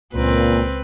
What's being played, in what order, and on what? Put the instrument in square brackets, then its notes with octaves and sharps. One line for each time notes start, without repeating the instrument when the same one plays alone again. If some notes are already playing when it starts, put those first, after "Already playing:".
[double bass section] C#2 [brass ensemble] A#2 [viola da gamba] C4 B4